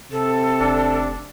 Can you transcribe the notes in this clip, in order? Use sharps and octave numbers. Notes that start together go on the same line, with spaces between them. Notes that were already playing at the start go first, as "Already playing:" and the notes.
C3 A4
F1 D4